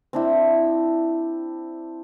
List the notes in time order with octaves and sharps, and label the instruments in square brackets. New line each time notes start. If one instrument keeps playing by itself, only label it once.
[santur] C4 D4 E4